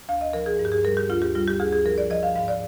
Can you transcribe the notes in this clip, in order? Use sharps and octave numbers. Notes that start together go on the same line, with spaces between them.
D2 F5
D#5
F3 A#4
G#4
G2
G4
G#4
G3 A#4
G4
D2 F4
G4
G3 F4
G4
D2 G#4
G#4
F3 A#4
D5
F3 D#5
F5
G#2 F5
D5